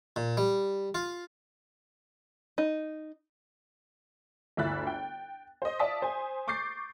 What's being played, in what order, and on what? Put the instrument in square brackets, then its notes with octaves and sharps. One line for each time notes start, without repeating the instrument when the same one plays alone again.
[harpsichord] A#2
G3
F4
[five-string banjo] D#4
[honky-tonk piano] G1 D2 E4 E5 F#6 A6
G5
C5 D#5
D5 E5 F5 A5 D#6 B6
C5 G#5
C#6 D6 G6 A6 C7